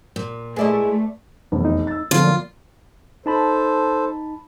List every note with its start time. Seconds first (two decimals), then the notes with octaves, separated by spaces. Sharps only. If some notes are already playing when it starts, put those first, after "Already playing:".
0.16 A#2
0.56 G#3 A3 E4 B4 D5 D#5
1.52 F1 B1 E2
1.65 D#4
1.87 E6 A6
2.11 D3 F3 B3 F4 A4
2.23 F#3 A#3 D5
3.26 D#4 A4 C5 A5 B5